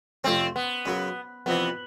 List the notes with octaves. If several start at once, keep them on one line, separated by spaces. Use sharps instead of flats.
F2 C3 F3 A3 C4 C#4
B3
F#2 C#3 F#3
F2 C3 E3 B3